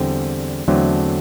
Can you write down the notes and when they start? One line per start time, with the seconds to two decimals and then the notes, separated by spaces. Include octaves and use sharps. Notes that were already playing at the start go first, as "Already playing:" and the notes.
Already playing: E2 D3 G3 C4
0.68 E2 D3 F#3 A3 C4